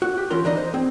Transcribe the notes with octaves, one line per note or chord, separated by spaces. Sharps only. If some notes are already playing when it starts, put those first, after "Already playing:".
F#4
G4
E3 C#4 F4 A#4 C6
E3 D4 D#4 D#5
C5
C4 G#4